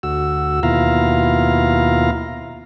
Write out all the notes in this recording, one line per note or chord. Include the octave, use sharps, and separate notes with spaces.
D2 F#4 E6
D#2 B2 E4 F4 F5 A#5